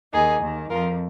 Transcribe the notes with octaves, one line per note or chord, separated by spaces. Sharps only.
D#2 D#3 D#4 G#4
D#2 D#3
F2 F3 F4 A#4